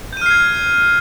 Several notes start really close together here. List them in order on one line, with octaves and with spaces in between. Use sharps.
G6 D#7 F6 C7 G#6